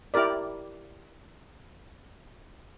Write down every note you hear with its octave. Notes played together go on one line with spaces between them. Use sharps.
E4 G4 A#4 D5